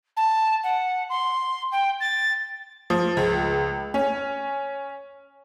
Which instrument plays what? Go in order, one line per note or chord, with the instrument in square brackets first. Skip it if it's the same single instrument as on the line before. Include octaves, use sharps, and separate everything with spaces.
[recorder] A5
F#5
C6
G5
A6
[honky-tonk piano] F3
C#2
C#4